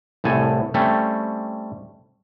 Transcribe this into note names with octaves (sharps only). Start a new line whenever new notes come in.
C2 A2 A4 G#5
G3 A3 C4 C#4